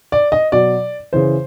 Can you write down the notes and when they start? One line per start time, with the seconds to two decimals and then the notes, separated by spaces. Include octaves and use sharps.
0.12 D5
0.32 D#5
0.52 B2 F#3 D5
1.13 C#3 E3 C5